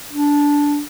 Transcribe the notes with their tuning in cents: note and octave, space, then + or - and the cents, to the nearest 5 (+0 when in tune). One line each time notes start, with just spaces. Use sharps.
D4 -15